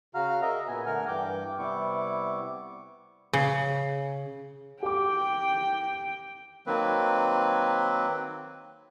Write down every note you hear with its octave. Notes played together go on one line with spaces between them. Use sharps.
C#3 F#4 F5 A#5 F6
A#4 D#5 E5 A#5
A#2 B3 G#5
D3 A3 A#4 F#5 G#5 F6
G2 E3 G5 D6
C3 G3 B3 E4 C#6 D6
C#3
G4 G5 D6
D#3 F#3 A#3 C4 B4